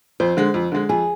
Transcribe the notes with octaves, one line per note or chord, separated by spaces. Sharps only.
F2 C5
D3 G#3
F2
D3 G#3
F2 G#4